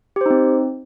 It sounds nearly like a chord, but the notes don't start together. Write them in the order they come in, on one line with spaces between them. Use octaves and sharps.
G4 C5 D#4 C4